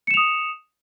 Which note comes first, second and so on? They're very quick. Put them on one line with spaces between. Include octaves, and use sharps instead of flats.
C#7 E7 F7 D#6